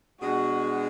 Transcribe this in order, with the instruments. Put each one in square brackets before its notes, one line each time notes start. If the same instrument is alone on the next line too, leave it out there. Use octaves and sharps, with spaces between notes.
[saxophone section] B2 G#3 D4 G#4 [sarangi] F#4